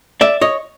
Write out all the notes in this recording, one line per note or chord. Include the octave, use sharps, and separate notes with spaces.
D5 E5
C#5 D#5